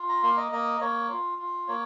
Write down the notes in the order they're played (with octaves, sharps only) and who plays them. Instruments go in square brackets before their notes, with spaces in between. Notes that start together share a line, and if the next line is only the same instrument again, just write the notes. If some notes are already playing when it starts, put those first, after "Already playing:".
Already playing: [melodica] F4
A#5
A#3 C6
D#5
A#3 D#5
A#3 C#5
F4
F4
A#3 C#5